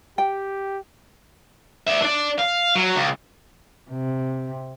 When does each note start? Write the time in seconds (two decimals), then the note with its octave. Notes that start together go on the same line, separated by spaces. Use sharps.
0.18 G4 G5
1.87 D5 E5
2.02 D4 D5
2.39 F5
2.76 F#3
2.95 C#2
3.90 C3